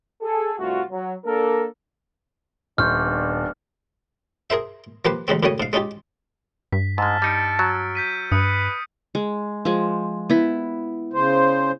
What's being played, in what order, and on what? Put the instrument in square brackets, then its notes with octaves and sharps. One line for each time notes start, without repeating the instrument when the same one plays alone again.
[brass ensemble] G#4 A4
C2 G2 A3 F4 F#4
F#3
A#3 D4 A4 A#4
[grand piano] D#1 [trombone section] B3 D4 [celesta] C6 C#6 G6 [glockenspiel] F6
[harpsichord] G#4 A#4 C5 E5
F3 A#3 G4 B4 C5
A1 C#3 G#3 C4
F#2 A2 C#3 G3 C#5 D#6
G#2 F5
G#3 C#4 D#4 F4 G4
[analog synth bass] G2 [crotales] B6
[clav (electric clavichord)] G#2 G#3 [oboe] A5 [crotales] E6 F6
[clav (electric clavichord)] G3 D#4 [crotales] A6 C#7 D7
[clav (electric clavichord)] F#3
[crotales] G6 B6 D#7
[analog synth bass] G2 [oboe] B4 [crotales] D#6 C#7
[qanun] G#3
F3 G#3
B3 E4
[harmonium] C#3 C5